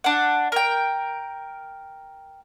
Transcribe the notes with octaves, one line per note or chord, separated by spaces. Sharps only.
D4 F#5
A#4 G5